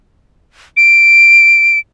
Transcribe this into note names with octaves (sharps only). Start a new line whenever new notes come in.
D7